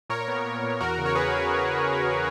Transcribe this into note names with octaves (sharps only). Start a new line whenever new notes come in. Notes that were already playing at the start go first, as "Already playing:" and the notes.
A#2 A#4 C#5
B3
A#2
A#2
E2 F#4 A#4
C#3
C#5
E2 G#4 B4
E2